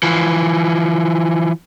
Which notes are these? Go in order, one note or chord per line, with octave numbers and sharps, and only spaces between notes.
E3 F3